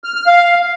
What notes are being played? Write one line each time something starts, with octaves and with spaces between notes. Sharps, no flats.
F6
F6
F5